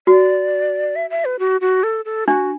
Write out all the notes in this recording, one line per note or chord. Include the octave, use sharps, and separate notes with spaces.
F#4 D5
E5
E5
B4
F#4
F#4
A4
A4
D4 F#4